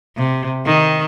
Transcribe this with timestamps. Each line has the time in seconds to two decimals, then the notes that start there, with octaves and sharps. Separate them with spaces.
0.17 C3
0.65 D#3